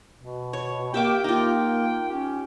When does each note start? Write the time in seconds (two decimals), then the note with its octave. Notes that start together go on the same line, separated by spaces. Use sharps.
0.20 B2
0.53 C#5
0.94 A#3 G4 E5 G5 D6
1.24 A#3 D#4 F4
2.08 C#4 G4